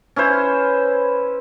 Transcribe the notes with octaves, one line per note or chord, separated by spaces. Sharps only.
C#4 E4 B4 C5